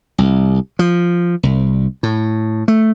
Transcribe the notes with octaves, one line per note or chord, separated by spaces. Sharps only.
C2
F3
C2
A2
A3